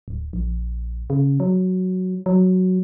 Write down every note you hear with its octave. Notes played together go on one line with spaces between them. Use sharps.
D1
A#1
C#3
F#3
F#3